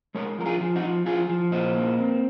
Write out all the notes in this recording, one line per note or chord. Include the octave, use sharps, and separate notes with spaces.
G#3 A#4 C#5
F3 A#4
F4 G#4
F3
D#4 F#4
F3
F3 F4 G#4
F3
A#2 C5 D#5
A#3
C4